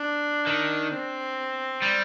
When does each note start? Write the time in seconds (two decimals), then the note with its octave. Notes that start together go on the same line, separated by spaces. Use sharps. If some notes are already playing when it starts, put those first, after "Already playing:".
Already playing: D4
0.47 D#3
0.92 C4
1.82 G3